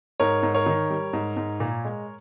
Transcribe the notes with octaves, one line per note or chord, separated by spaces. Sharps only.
G#2 A#4 C#5
G#2
A#4 C#5
D#3
G3
G#2
G#2
A#2
G#3